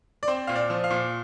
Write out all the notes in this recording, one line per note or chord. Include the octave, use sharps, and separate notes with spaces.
D5
C4 C5
A#2 F5
D5
F3
F5
A#2